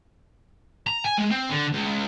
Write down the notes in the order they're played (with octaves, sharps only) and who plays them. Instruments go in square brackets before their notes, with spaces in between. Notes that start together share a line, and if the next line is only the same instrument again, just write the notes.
[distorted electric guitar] A#5
G#5
G#3
C4
D3
C#2